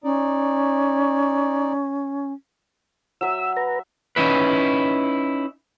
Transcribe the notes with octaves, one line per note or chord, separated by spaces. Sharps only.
C#4 D#4 D5
F#3 E5 E6
B4 A#5
C#4 D#4 E4 B4